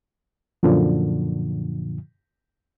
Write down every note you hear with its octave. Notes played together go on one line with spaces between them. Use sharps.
F#2 A#2 D3 F3